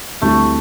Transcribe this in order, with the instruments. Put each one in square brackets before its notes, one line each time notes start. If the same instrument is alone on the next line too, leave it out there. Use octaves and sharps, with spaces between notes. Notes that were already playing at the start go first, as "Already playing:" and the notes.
[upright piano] D2 D3 G3 C4 E4 [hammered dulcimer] A3